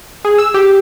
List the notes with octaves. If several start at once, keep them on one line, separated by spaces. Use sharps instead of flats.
G#4
E6
G4